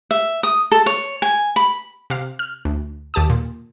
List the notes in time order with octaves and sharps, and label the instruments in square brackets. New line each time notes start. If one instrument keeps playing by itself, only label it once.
[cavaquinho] E5
D#6
A4
C#5
G#5
B5
[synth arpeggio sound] C3 F5
F6
D2
D#2 G4 A5 D#6
A#2